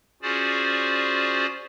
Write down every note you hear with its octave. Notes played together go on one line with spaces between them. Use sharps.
C#4 F4 F#4 G#4 C5 D5